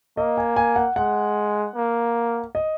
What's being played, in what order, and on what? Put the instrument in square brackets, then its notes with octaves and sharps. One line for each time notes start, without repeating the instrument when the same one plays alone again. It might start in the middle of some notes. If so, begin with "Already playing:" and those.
[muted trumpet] A#3 [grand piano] D#5
[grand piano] G#5
G#5
F#5
[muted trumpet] G#3 [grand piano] F#5
[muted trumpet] A#3
[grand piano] D#5